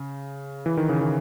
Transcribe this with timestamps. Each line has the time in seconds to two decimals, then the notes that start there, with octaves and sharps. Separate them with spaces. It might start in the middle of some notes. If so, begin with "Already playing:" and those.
Already playing: C#3
0.66 E3
0.77 D#3
0.89 C#3
1.01 D#3